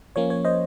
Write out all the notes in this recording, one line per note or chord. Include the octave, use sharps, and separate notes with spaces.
F3 A#3 C#4 C#5
C#5
C5 D#5